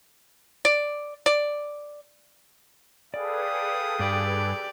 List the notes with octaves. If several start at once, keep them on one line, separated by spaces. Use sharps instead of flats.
D5
D5
G#4 A4 B4 D5 F5 G5 D#6
G2 G4 D5